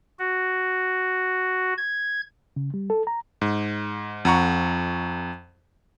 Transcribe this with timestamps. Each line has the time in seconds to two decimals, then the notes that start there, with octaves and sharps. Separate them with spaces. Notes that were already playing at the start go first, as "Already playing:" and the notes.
0.19 F#4
1.77 G#6
2.56 C#3
2.74 G3
2.90 A4
3.07 A#5
3.41 G#2
4.25 F2 F#5 A#5 C#6